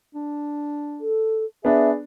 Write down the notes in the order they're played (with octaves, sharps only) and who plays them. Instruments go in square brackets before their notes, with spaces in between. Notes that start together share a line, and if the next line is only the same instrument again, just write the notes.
[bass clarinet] D4
[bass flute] A4
[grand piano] B3 D4 [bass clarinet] G#4 [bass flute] E5